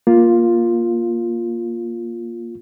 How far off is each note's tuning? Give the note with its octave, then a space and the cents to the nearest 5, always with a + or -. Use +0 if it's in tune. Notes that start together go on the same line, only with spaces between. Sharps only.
A#3 +15 F4 +0